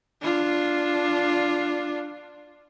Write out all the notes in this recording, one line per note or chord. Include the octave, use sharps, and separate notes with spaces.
D4 F4